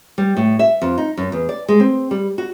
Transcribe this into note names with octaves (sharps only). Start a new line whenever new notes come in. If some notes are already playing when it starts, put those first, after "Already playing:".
G3
A2
E5
F2
D#4
F#2
E2
D5
G#3
C4
G3
F#4